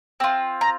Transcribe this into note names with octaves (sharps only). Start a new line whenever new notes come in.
C4 F4
A#5